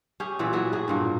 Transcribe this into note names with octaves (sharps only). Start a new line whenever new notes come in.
C#4 G4 G#4
A#2 E3 B3 D5
F#3 B3 F#4 G#4
A2 F#4 G#4
G2 A#2 A#3